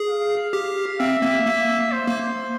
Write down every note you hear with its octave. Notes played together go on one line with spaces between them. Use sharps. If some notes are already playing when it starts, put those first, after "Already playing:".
Already playing: G#4
F5
G4
C4 E5
A#3
A#3
C5
A#3